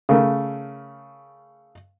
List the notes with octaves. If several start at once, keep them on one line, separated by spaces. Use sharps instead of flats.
C#3 A3 A#4